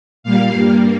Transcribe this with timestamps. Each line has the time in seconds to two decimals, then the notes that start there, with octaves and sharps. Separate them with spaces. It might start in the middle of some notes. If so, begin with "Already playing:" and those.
0.23 A#2 G3 A#3 F5
0.52 G2 G3 A#3